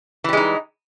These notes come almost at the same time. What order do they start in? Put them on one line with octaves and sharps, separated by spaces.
E3 G3 G#3 D#4